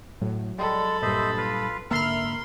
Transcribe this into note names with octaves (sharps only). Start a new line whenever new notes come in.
A2 F#3
G3 G#3 A4 B5
G2 A#2 C5 D#5 E5
F4 B4 F5
G#2 D3 A#3 A#4 E5 B5 C6 F6